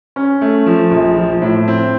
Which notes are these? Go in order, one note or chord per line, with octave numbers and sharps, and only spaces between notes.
C#4
A3
F3
A#1
F3
A2
C4